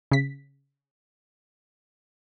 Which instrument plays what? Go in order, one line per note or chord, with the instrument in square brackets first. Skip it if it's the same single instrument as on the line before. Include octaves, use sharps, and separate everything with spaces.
[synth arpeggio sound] C#3 B6